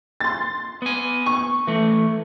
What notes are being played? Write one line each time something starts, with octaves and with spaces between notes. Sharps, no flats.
C6 A6
B3 G#5
C#6
E3 A3